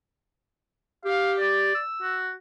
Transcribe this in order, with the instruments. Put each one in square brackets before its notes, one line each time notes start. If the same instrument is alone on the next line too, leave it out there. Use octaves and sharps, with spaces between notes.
[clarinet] G4 [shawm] F5
[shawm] D5
[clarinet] E6
[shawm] F#4